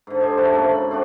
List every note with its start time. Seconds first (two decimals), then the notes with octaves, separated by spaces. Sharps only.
0.07 G#2 D3
0.21 G4 C5 D#5 G#5
0.38 E4 F#4 G4 A5
0.52 G#2 C#3 A3 A#3
0.72 B5
0.91 C4 D4 F#4